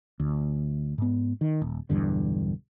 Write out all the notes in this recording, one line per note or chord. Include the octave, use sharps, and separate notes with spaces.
D2
G#2 B3
D#3
D#1
B1 E2 G2 D3